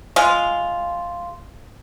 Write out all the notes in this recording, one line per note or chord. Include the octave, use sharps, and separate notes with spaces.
G#3 F4